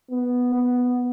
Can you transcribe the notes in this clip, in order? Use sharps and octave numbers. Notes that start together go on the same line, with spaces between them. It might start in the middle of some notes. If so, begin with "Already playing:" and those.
B3
B3